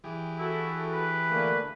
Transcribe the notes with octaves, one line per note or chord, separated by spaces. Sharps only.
E3 G4 G#4
E4 F#4 A4
B4
D3 A3 A#3